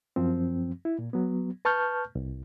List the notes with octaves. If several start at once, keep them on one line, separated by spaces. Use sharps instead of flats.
F#2 F3 C4
E4
A#2
F#3 B3
B4 A5 C#6 F6 G6
C2